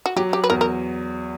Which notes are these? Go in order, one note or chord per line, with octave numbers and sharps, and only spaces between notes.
F#4
F#3 G4
G4
B4
E2 A#4
A#4